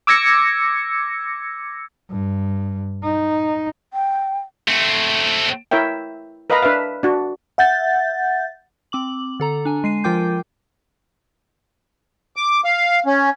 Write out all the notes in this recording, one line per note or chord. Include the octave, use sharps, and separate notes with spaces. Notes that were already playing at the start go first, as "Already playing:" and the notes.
D6 E6 G#6 A#6 C#7
G2
D#4
G5
A3 C4
E4 A#4 C#5 E5 G5
A#4 B4 D#5 F5 A#5 B5
D4 B4 E5 F5
D4 F#4
E5 F#5 G6 A6
C4 D6 F#7
D3 A4 A#5
D4 G#5
G#3 C7 D#7
F3 F4 A#4 G5 D6 G6
D6
F5
C#4